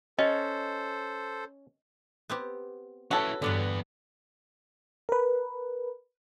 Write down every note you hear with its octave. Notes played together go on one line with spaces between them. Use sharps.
C#4 A4 C5 D#5
B3 C4 G4
C#4 E4 F#4 A4 B4 C#5
E2 G2 D3 B3 D4 B4
A#4 B4